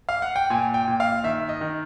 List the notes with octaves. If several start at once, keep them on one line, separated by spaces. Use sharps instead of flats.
F5
F#5
G5
A#2 G#5
G5
A#2
F5
D#3 E5
D#5
D#3